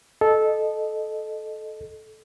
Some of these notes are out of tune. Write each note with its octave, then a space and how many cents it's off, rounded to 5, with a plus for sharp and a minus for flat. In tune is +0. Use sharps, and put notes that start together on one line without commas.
A4 -15 D#5 -15